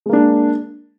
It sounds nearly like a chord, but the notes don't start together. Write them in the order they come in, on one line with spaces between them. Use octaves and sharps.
G#3 A#3 D4